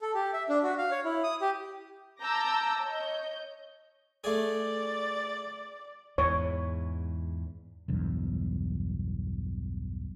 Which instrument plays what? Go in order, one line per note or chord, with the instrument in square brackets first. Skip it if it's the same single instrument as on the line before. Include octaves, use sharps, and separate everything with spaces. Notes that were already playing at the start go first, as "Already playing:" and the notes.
[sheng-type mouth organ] A4
G4
E5
D4
F#4
F5
C#5
E4
D#6
G4
[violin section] A5 A#5 D6 E6 G6 A#6
C#5 D#5 G6
[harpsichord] A3 G#4 [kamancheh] D5
[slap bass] E2 G#2 E3 [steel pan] C#5
[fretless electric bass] B1 E2 G2